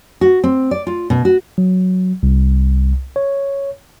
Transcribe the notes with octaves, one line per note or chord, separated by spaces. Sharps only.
F#4
C4
D5
F4
B2
F#4
F#3
C2
C#5